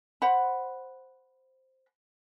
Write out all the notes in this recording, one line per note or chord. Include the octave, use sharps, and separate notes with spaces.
C5 F#5 B5